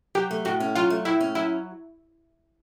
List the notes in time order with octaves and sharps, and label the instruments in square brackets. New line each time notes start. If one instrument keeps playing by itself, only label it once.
[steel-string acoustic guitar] F#3 [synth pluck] G4
[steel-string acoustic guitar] A3
[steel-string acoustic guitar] A2 [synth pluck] F#4
[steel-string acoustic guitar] C#4
[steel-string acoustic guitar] F#3 [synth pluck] F4
[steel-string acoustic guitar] A3
[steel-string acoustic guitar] A2 [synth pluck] E4
[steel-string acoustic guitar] C#4
[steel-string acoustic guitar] F#3 [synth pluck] E4